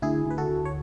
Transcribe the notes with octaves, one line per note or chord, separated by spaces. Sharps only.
D2 E4 G#4
D2 B4
F#4 A4
D2
C#5